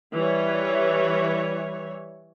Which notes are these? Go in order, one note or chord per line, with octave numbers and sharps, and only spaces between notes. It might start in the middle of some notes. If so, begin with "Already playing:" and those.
E3 G3 C#5